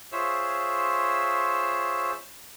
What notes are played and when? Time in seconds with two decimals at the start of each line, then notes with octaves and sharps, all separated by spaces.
0.12 F4 G#4 C5 C#5 E5 E6